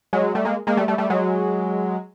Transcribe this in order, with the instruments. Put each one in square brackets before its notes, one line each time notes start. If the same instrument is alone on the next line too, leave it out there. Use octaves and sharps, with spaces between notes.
[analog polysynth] F#3 G#3
G3 A3
G#3 A#3
G#3 A#3
G3 A3
G3 A3
G3 A3
F#3 G#3